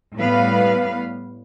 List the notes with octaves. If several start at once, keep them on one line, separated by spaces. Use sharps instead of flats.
A2 G3 B3 B4 F5